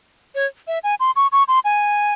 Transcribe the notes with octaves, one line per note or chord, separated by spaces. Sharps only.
C#5
E5
G#5
C6
C#6
C#6
C6
G#5